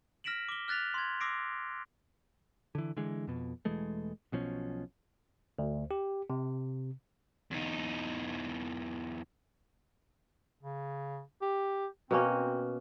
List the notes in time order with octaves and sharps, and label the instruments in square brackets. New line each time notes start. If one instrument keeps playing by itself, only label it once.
[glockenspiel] F6 A#6 B6 D7 E7 F#7
D6 G7
F6 F#6 A6 B6 F7
C6 G#6
D6 E6 A#6 C7 D7
[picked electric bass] D3 E3
D3 E3 G#3
F2 B2
E1 E3 G#3 A3
B1 B2 F3 C#4
[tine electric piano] D2
G4
C3
[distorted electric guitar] E2 D#4
[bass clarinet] C#3
G4
[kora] B2 A#3 C#4 [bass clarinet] C4